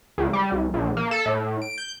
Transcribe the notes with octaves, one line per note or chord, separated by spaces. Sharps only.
C#2
G3
C2
A#1
A#3
A4
A2
D7
G6